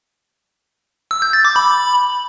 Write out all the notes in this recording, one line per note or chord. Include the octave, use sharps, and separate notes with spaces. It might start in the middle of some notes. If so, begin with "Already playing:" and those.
E6
G6
A6
D6
B5